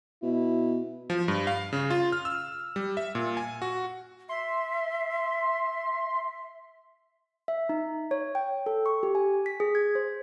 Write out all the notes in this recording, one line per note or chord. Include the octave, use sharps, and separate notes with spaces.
B2 E4
F3
G2
F5
C#3
F4
F6
E6
G3
E5
A#2
G#5
F#4
E5 C6
E5
D#4
C#5
G5
A4
C#6
G4
G#5
B6
G#4
G#6
C5